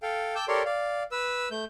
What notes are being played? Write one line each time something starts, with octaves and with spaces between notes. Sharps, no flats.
A4 F5 G5
G5 A5 D6 E6 G6
G4 A4 A#4 C#5 D5 C6
D5 F5
B4 E6
A3 G6